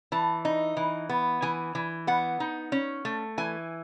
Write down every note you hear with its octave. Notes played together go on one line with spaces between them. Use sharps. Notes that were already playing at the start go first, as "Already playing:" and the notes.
E3 A5
D#4
E3
B3
E3 G#5
E3
B3 F#5
D#4
C#4
A3
E3 G#5